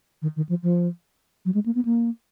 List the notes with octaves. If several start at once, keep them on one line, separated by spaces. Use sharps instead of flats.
D#3
D#3
F3
F3
F#3
G#3
A#3
B3
A#3